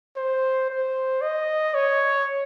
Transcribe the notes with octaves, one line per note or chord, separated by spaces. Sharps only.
C5
C5
D#5
C#5